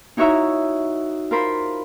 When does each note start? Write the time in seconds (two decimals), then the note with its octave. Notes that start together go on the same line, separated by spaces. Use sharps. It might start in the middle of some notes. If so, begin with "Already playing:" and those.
0.17 D#4 E4 F#4 C#5 E5 A#5
1.31 F4 A#4 C5 B5